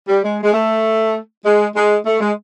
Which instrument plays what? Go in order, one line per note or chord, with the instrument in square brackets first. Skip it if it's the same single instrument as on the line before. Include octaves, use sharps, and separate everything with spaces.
[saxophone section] G3
G#3
G#3
A3
G#3
G#3
A3
G#3